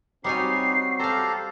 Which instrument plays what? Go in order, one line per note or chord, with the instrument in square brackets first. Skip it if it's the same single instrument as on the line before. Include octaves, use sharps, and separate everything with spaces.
[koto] G3 C#5 G#5 [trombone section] C4 F#4 [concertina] D#4 G4 [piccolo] C7
[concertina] G4 A4 A#5 [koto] C5 F5